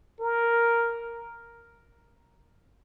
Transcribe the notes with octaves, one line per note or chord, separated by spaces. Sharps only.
A#4